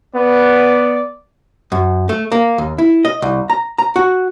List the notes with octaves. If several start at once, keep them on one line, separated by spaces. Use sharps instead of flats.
B3 D5
F#2
A3
A#3
D#2
E4
D#5
C2
A#5
A#5
F#4